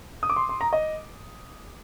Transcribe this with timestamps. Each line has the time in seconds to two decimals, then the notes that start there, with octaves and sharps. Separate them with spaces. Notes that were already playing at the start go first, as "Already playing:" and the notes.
0.23 D#6
0.30 D6
0.36 C6
0.49 C6
0.61 A#5
0.73 D#5